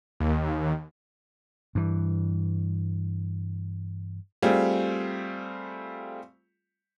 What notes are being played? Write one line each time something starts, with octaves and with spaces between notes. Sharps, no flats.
D#2
G2 E3
G3 A3 C4 F4 G#4